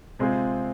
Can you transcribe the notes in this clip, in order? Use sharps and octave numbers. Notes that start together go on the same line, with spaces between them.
C3 G#3 C4 F4 G#4